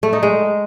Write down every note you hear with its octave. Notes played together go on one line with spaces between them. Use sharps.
A3
D#4
G#3